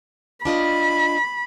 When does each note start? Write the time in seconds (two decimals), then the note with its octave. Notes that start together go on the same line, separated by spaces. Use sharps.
0.45 D4 F4 D#5 B5